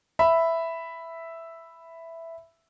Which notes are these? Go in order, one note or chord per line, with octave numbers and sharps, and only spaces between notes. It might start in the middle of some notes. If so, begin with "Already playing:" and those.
E5 B5